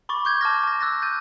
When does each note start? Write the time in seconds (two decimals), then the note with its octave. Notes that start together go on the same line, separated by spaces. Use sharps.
0.09 B5 C#6 D6 A6
0.25 C#6 G6 G#6
0.41 A5 D6 F6 A#6
0.64 A5 A#6
0.81 E6 F#6 A6 A#6
1.02 G6 A6 D#7